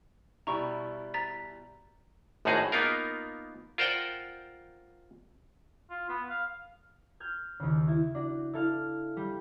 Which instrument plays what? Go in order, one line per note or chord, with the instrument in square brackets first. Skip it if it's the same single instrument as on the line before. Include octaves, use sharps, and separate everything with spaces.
[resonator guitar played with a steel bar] B2 G3 E4 [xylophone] A#5 C#6
[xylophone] A#5 A6 B6
[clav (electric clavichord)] G#1 F#2 A2 D#4 F#4 G#4
A#3 B3 D#4 F4 A#4
F4 A#4 C5 D5 F#5 G5
[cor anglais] F4
B3
F5
[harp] F6 G6 G#6
D#2 C#3
E4
D4 F#4
E4 A4 F5
G3